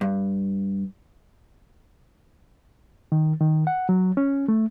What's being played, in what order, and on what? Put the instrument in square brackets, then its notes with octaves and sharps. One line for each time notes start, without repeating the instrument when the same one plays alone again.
[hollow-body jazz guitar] G2
[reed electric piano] D#3
D#3
F#5
F#3
C#4
A3